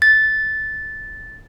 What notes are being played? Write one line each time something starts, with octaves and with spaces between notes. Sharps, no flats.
A6